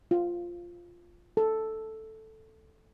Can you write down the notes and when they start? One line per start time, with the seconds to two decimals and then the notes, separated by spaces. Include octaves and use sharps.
0.11 F4
1.37 A4